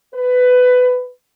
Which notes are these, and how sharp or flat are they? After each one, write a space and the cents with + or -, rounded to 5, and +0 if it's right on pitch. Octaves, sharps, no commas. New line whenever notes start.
B4 +15